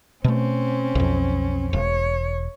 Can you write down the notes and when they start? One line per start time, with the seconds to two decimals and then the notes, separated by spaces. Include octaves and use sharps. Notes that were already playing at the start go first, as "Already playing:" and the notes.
0.24 B2 A3 C4 C#4
0.95 B1 F2
1.73 E1 C#5